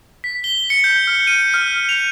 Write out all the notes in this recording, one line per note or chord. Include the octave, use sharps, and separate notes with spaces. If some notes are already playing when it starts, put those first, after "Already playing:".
B6
G7
C#7
G6
F6
D#7
F6
F7